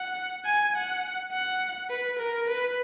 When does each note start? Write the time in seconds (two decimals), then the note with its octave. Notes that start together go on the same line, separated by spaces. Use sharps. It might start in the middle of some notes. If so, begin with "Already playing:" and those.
Already playing: F#5
0.45 G#5
0.75 F#5
1.32 F#5
1.90 B4
2.19 A#4
2.47 B4